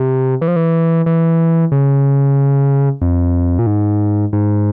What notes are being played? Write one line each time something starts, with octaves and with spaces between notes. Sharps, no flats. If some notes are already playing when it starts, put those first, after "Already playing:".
Already playing: C3
E3
F3
E3
E3
C#3
F2
A#2
G#2
G#2